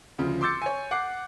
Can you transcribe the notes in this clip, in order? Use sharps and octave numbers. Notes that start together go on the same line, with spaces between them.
D2 C#3 F3
C6 D6 E6 G6 A6 C#7
C#5 G#5
F#5 D6 F#6 C7